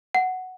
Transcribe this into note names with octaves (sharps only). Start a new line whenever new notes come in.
F#5